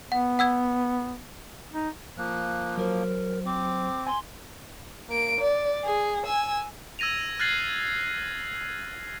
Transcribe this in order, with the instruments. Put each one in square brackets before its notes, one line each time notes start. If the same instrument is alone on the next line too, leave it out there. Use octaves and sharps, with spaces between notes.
[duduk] B3 [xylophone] F#5
[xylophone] F#5 E6 G#6
[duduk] D#4
[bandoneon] F3 A#3 [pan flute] F#6
[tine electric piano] F#3 C5 [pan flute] A#4
[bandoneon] C4 [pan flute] D6
[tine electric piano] G#5 [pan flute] C6
[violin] A#3 D7
D5
G#4
G#5 E6
[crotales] E6 G#6 A#6 D#7 F7
F6 F#6 G#6 A6 C7 F#7